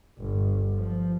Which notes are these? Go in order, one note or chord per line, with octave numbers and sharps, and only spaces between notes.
G1
F3